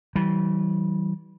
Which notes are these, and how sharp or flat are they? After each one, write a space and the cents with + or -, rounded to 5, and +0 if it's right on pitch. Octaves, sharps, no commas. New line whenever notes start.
E3 -25 G3 -45